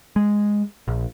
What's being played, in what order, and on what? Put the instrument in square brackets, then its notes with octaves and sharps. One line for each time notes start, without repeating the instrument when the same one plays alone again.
[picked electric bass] G#3
A#1